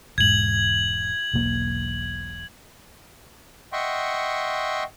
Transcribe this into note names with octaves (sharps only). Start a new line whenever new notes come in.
E1 G#2 G#6 F#7
E1 B1 A#3
D#5 E5 F#5 G5 C6 C#6